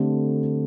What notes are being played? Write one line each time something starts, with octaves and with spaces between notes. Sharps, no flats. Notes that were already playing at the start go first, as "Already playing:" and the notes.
Already playing: D3 A3 C4 G4